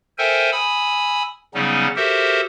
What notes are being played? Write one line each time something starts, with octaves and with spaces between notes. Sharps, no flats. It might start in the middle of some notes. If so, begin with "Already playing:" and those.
A4 A#4 C5 E5 G5 G#5
G#5 B5 D#6 E6
C#3 F#3 G3 B3 C#4 D#4
F#4 G4 A4 A#4 C5 E5